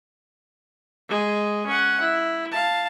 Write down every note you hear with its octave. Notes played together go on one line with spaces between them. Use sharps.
G#3 G#4
C#4 F#5
E4
F5 A5